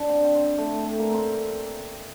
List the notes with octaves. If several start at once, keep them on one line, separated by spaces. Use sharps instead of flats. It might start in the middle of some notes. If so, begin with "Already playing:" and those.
Already playing: D4
C4
C4
C4
A3
A3
A#3
C4